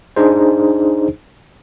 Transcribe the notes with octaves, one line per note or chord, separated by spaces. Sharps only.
D4 D#4 G#4 C5